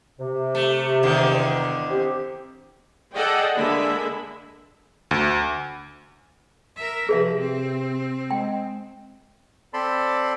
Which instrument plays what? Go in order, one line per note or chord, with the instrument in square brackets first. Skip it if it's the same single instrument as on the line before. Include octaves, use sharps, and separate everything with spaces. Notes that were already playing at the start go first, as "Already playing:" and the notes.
[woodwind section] C3
[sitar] A3
E2 D3 D#3
[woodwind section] C4 G4
[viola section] G#4 A4 D5 D#5 F#5 G5
D3 G#3 A#3 E5 B5
[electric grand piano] D2
[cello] A#4 E5
[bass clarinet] C3 [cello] F3 [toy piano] G#4 B4 E5
[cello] C4
[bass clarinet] G#3 [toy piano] G5
[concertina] C4 A4 D5 A5 B5 C6